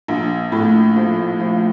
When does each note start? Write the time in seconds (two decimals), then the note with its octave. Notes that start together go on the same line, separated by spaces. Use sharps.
0.08 A#1
0.52 A2
0.97 F3
1.40 F3